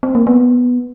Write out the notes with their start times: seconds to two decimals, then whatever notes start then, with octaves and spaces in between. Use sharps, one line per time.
0.03 C4
0.15 A#3
0.27 B3